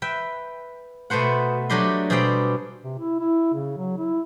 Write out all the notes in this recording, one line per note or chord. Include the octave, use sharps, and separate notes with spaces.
B4 E5 G5
B2 A3 B3 C5 F#5
F#3 A3 D4 G4 D#5 C6
B2 G3 G#4 C5 D5 G5
C3
E4
E4
C#3
F#3
E4